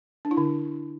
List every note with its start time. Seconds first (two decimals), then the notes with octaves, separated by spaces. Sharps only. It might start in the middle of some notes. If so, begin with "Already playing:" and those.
0.25 D4
0.31 E4
0.37 D3